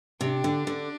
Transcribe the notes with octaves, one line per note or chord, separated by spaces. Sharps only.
C3 D4
D3
D3